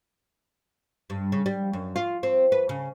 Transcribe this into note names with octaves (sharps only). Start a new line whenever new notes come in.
G2
C#3
G3
F#2
F4
C4
B4
C#3